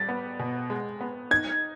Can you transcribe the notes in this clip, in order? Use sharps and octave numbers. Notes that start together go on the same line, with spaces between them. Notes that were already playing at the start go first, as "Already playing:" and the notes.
Already playing: G3 A6
B3
B2
G#3
B3
D#4 G#6